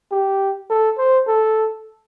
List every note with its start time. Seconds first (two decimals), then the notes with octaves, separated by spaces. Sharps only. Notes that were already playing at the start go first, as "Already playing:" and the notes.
0.12 G4
0.70 A4
0.98 C5
1.28 A4